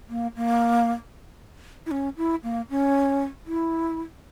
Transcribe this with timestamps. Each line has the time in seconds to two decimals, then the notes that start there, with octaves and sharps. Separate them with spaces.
0.09 A#3
0.36 A#3
1.86 E4
1.91 C#4
2.17 E4
2.43 A#3
2.70 C#4
3.47 E4